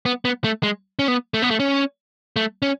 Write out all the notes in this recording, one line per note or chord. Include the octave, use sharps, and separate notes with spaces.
B3
B3
A3
G#3
C#4
B3
A3
B3
A3
C#4
A3
C#4